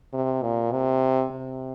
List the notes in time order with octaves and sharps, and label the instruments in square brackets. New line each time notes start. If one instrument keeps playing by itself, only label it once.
[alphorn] C3
A#2
C3
C3